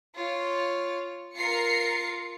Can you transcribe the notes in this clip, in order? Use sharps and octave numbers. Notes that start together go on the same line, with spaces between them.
F4 C#5
F4 A#4 C7 C#7